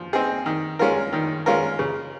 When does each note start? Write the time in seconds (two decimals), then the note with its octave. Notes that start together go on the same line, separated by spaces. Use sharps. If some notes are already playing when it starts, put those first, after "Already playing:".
Already playing: F3
0.13 C4 D#4 G#4
0.46 D#3
0.79 G#3 C#4 F4 A#4
1.13 D#3
1.46 G#3 C#4 F4 A#4
1.79 C#3